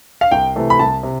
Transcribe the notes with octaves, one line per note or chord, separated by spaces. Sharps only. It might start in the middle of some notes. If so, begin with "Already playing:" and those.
F5
C2 G5
C3 E3 A3
B5
C2 A5
C3